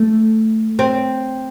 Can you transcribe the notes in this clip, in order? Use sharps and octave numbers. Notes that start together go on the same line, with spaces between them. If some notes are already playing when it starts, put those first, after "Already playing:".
Already playing: A3
C4